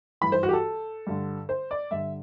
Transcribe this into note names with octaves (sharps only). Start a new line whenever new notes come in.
G2 E3 B5
C5
F#4
G4
A4
G2 D3
C5
D5
G2 D3 E5